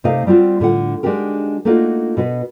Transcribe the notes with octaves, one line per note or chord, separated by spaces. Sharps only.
C3 A3 D#4 D5 D#5 F5
G3 C4 F4 F#4
A2 D3 F4 F#5
G#3 D4 D#4 F#4 G4 A#4
A3 A#3 D4 D#4 F4 F#4
B2 F#4 B4